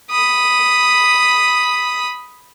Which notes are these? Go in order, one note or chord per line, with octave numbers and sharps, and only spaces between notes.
B5 D#6